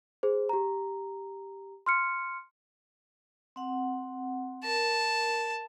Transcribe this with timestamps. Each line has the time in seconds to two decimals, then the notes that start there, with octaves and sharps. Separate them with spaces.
0.23 G#4 C5
0.49 G4 A#5
1.86 C6 F6 C#7
3.56 C4 F#5
4.64 A#4 A5